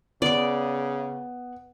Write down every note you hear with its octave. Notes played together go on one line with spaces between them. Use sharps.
C#3 B3 D5 D6